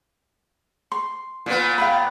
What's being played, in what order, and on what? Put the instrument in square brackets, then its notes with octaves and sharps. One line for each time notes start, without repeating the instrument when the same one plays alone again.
[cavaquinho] C6
[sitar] A#2 B3
[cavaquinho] F5 G5 B5